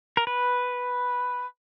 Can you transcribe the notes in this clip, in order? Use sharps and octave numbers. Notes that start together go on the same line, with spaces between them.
A#4
B4